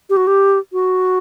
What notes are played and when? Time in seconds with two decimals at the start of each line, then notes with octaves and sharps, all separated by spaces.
0.10 G4
0.17 F#4
0.27 G4
0.73 F#4